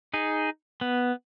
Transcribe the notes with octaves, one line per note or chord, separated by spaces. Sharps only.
D#4 G#4
B3